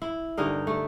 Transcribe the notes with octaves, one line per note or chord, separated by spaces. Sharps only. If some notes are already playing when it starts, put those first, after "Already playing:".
E4
G2 D3 D#4 A#4
A3